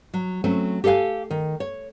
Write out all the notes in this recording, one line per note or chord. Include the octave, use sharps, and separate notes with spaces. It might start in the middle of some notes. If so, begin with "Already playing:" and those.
F#3
F#3 A3 C4 C#4
G4 A4 E5 F5 G#5
D#3
C#5